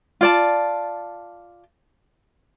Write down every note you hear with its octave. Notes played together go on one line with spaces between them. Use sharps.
F4 D5 A5